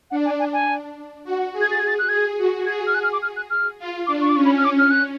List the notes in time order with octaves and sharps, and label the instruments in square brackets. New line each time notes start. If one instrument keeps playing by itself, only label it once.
[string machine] D4 [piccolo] F#5
[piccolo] G#5
G#5
G#5
[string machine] F#4
[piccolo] F#5
[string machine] G#4
[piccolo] G#6
A6
G#6
A6
F#6
[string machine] G#4 [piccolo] G#6
[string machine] F#4
[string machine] G#4 [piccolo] G#6
[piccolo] F6
F#6
F6
D6
F6
F#6
F6
[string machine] F4
[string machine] D4 [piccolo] D6
[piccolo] C#6
D6
[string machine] C#4 [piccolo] C#6
[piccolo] B5
F6
D6
F6
F#6